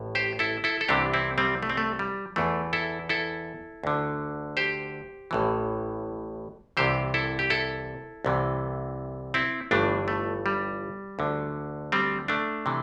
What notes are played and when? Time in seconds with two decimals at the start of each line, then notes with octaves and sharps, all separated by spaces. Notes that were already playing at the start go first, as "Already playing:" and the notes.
Already playing: A1 A2
0.15 G4 C5
0.39 E4 A4
0.64 E4 A4
0.81 A4
0.89 C2 C3 E3 D4 G4
1.13 C4 E4
1.38 G3 C4
1.63 A3
1.70 C4
1.77 A3
1.99 G3
2.36 E2 E3 A3
2.73 E4 A4
3.09 E4 A4
3.84 D2 D3
4.57 G4 C5
5.31 A1 A2 E3
6.77 C2 C3 E3 G4 C5
7.14 E4 A4
7.39 G4
7.50 E4 A4
8.25 C2 C3 E3
9.34 C4 E4
9.71 G1 G2 E3 A3 D4
10.08 A3
10.46 G3
11.19 D2 D3
11.92 G3 C4
12.28 A3 D4
12.66 C3 E3